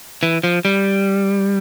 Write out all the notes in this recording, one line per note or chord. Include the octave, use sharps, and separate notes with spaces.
E3
F3
G3